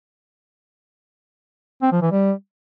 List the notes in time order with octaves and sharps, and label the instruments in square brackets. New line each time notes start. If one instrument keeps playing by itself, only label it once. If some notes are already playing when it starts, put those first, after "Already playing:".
[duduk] C4
F3
E3
G3